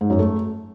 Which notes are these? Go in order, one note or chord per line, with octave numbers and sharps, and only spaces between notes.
G#2
F#2
A3